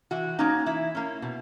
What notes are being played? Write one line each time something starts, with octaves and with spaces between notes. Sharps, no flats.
E3 F#4
A#3 C#4 D#4
E3 E4
A#3 C#4
B2